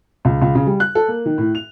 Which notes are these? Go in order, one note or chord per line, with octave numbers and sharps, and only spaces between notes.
C#2
C#2
C#3
G3
F#6
A4
A#3
D#3
A2
F7